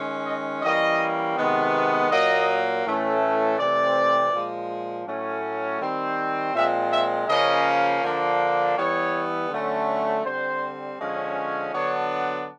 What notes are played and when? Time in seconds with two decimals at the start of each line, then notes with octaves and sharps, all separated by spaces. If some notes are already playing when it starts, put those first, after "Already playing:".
Already playing: D#3 G#3 C#4
0.25 D#5
0.62 E3 G3 A#3 C#4 D#5
1.36 C3 D#3 G#3 B3
2.10 A#2 F#3 A#3 D#5
2.84 A2 E3 A3 C#4
3.58 C3 E3 A3 C4 D5
4.33 A#2 F3 G#3
5.07 A2 F#3 A3 C#4
5.80 D#3 G3 C4
6.54 A#2 F3 G#3 C4 E5
6.91 E5
7.28 C#3 F3 A#3 C#4 D#5
8.03 D3 F3 A#3 D4
8.77 E3 G3 B3 C#5
9.50 D3 F#3 A3 C#4
10.24 D3 G3 C4 C5
10.99 D3 F3 G#3 C#4
11.72 D3 F#3 B3 D4 C#5